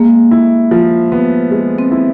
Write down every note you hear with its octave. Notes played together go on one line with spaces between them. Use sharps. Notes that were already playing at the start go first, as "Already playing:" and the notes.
Already playing: G#3 A#3
E4
F3
B3
G#3
C4
E4